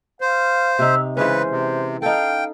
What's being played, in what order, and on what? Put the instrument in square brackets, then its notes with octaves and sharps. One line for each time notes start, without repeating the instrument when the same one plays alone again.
[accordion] C5 [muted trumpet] F5
[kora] C3 D#4 [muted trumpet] E5
[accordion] C#3 B4 [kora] E3 G#3 C#4 [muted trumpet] C5
[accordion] C3
[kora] D#4 A4 [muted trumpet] F5 [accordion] G5